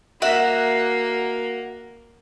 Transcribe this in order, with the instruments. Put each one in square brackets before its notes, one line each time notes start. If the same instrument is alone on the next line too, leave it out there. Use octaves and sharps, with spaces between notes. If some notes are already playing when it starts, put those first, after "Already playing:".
[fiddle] A#3 [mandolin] F#4 E5 F#5